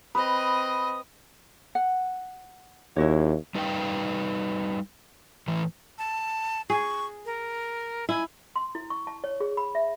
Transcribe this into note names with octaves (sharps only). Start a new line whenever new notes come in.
C4 B4 D#5 B5 D#6
F#5
D#2 E4 F#4 C#5
G3 D#4 B4 F5 G5
A2 E3
A5
G#4 C#6
A#4
E4 G#5
C6
E4
C#6
A5
C#5
G#4
B5
E5